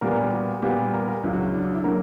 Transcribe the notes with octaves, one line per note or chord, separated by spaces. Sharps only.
A#2 G3 B3 A#4
A#4
G4
F#4
A#2 G3 B3 G4
A#4
A#4
C#2 C#3 F#3 E4
F#4
E4
D4
D4
E4
D3 F#3 A#3 A#4